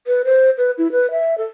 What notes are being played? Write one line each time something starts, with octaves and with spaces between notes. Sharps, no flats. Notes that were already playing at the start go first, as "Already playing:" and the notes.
B4
C5
B4
E4
B4
E5
A4